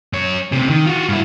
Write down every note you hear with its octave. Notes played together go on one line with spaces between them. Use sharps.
F#2 C#5
D2 C3
D#3
F4 F#4
G2 E4